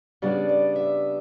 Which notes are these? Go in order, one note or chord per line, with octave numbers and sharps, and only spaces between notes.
C#3 G3 B3 D4 D5
D5
E5